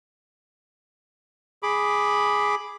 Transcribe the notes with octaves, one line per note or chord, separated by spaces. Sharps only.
G#4 B5 D6